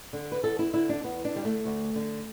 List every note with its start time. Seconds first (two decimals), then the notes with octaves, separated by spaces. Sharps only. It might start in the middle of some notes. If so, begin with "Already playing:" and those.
0.13 D3
0.32 B4
0.43 E2 A4
0.59 E4
0.73 D3 E4
0.89 D4
1.04 E2 B3
1.25 D4
1.35 D3 G3
1.45 A3
1.65 D2
1.95 D3